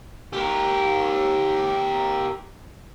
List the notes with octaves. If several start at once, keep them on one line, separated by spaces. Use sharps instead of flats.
G4 A#4